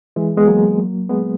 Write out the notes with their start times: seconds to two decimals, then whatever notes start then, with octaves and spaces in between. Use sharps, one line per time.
0.16 E3 G#3
0.37 G#3 B3
0.47 F#3 A#3
1.09 G#3 B3